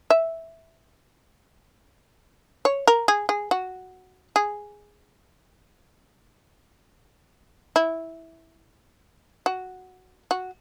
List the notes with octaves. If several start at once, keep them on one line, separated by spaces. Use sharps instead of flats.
E5
C#5
A#4
G#4
G#4
F#4
G#4
E4
F#4
F#4